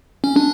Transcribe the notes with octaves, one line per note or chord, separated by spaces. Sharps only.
C#4
D4